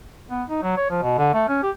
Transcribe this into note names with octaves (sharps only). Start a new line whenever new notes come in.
B3
D#4
F#3
C#5
F3
B2
D3
A3
C#4
G4